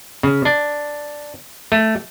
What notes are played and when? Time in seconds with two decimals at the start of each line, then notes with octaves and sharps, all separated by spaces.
0.23 C#3
0.45 D4
1.72 A3